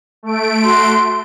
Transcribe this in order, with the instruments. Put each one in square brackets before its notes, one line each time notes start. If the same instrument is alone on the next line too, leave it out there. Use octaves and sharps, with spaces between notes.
[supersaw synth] A3 D7
[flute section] F#4 C6